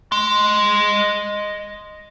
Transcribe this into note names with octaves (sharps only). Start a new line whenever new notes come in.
D#5 C6